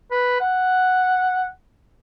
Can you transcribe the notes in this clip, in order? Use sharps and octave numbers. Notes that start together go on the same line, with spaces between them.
B4
F#5